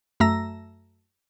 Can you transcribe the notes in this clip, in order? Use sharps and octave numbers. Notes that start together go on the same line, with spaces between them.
F#2 A3 E5 A#5 E6 A#6